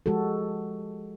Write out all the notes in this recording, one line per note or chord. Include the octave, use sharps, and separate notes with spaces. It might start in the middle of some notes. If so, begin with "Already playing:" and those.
F3 G#3 F#4 G4 A4